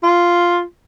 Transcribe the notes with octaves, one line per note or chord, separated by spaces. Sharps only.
F4